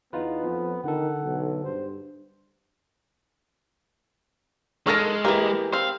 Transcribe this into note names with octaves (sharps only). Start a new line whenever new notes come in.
E2 B3 D#4 F4 B4
F2 F3
D3 D#3 A4 F#5
B1
G2 C5
G#3 D#4 A4 A#4 C#6 F6 A#6
E3 A#3 G4 A#4
C4 F5